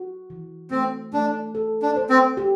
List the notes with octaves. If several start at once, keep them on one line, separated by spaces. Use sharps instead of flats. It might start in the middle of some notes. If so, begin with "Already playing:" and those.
Already playing: F#4
E3
A3 C4
A3 D4
A4
D4
C5
C4
G4